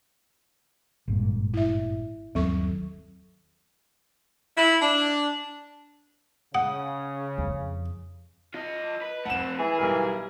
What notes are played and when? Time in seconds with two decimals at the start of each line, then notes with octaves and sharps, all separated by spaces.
1.08 G#1 G2 A#2
1.54 E4 E5
2.35 G1 D#2 F#3 C4 A4 C#6
4.56 E4
4.81 D4
6.55 C#3 F#5 D#6
7.38 F2
8.54 F4 D#5
9.01 B4
9.26 A3 C4 F#5 E7
9.59 E3 G#4
9.78 B1 G3 A#4